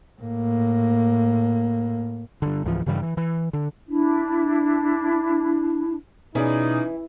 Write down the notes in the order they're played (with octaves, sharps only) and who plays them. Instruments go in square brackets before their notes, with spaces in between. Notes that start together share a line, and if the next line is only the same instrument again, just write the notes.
[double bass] A2 A#3
[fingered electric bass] G2 D3
C#2 G#2 E3 F3
G2 C#3 E3 G3
E3
E3
D3
[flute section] D4 E4
[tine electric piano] B2 [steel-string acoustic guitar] E3 [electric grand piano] C#4 G#4 D5 [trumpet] D#4